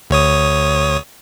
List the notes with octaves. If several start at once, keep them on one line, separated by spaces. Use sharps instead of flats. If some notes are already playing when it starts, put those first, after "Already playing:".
D2 C#5 D#6